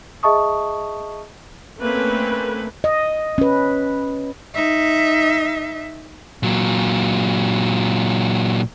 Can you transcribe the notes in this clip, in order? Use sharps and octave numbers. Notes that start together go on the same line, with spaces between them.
G#4 D#5 E5 A5 C#6 D#6
A3 A#3 C4 C#4 B4
D#5
C#4 B4
D#4 E5
A#2 F#3